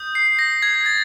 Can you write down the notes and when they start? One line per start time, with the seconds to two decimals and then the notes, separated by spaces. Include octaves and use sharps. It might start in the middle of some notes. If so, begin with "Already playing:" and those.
Already playing: D#6 G6
0.15 C7
0.39 A#6
0.62 G#6
0.86 A6